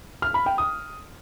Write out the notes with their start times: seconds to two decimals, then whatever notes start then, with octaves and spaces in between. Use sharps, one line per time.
0.22 F6
0.34 B5
0.46 G5
0.58 D#6